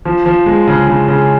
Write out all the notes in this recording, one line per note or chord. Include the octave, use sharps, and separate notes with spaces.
F3
F3
G#3
C#3
C#3
C#3